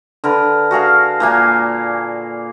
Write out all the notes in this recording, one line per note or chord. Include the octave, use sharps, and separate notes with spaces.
D3 A#4 B4
F#4 G#4 A#4 F5
A#2 A#3 F5 G#5